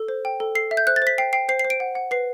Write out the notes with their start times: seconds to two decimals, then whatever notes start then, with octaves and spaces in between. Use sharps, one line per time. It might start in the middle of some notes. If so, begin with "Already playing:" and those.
Already playing: A4
0.09 C5
0.25 G5
0.40 A4
0.55 A4 C7
0.71 E5
0.77 G6
0.87 C5 F#6
0.96 A6
1.02 C5 B6
1.18 G5 C7
1.33 G5 C7
1.49 C5 C7
1.59 C7
1.65 C5
1.70 D7
1.80 F#5
1.95 F#5
2.11 B4 C7